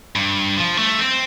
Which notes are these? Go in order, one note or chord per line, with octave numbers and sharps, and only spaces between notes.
G2
F3
A3
C4